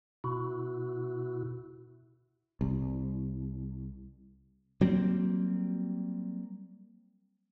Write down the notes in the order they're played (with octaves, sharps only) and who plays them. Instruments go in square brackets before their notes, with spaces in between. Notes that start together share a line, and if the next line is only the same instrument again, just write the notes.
[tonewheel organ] B2 E4 F#4
[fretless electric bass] C2
[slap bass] F#3 G3 A#3 C4